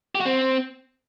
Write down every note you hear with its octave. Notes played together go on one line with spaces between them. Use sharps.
G4
F#4
C4